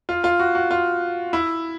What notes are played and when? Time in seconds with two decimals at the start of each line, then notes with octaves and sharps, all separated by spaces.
0.09 F4
0.24 F4
0.39 F#4
0.55 F#4
0.71 F4
1.33 E4